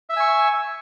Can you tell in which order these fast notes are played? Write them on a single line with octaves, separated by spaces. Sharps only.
E5 E6 G#5 C#6